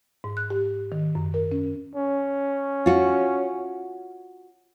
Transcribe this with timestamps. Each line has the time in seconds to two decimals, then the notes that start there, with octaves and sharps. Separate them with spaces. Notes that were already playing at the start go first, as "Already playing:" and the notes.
0.24 G#2
0.37 F#6
0.50 G4
0.92 D#3
1.15 F#2
1.34 A#4
1.52 C#4
1.95 C#4
2.86 F4 F#4